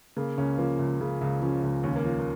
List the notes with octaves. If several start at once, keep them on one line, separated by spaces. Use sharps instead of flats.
C#3 A#3
C#2 C#4
F3 A#3
C#2
C#3
C#2
F3 C#4
C#2
D#2 C#4
A#3
F3
A#3